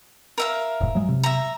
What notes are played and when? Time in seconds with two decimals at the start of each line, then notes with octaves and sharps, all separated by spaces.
0.38 A#4 E5 F5
0.81 E1 G#2
0.95 F#3 G#3
1.08 C3
1.24 E5 A#5